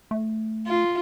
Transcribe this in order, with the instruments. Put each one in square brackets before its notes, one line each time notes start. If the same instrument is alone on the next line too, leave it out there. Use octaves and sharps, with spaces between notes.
[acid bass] A3
[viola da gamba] F4